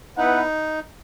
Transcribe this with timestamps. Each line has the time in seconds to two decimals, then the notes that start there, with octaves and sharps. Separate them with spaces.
0.18 B3 D#4 E4 B4 F#5